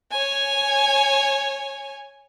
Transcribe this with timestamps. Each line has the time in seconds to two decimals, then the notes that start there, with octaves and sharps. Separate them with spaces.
0.11 C#5 G#5